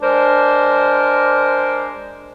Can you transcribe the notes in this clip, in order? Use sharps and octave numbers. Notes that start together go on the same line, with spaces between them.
G#3 D4 A#4 C5